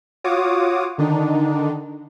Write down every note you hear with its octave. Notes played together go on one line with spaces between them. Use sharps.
F4 F#4 C#5 D6 D#6
D3 D#3 D4 D#4